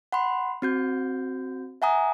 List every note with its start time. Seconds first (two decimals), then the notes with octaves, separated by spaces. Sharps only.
0.12 F#5 B5 C6
0.62 C4 F#4 G6
1.82 E5 F#5 G#5 A#5 D#6